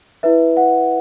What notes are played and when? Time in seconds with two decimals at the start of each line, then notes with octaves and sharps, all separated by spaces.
0.23 E4 B4 E5
0.57 F#5